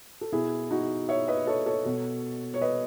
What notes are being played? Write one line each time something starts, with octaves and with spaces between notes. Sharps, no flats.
A4
B2 E4 G#4
D#4 F#4
C#5 E5
B4 D#5
A4 C#5
A4 C#5
B2
C#5
B4 D#5